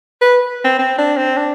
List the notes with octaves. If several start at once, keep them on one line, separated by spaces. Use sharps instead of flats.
B4
C4
C4
D4
C4
D4